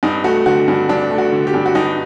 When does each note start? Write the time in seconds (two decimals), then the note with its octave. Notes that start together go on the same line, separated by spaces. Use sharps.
0.03 G2 D#4
0.24 A3 F#4
0.46 D3 F#4
0.68 G2
0.89 G2 D4
1.11 A3
1.18 F#4
1.32 D3
1.47 G4
1.54 G2
1.66 F#4
1.75 G2 D#4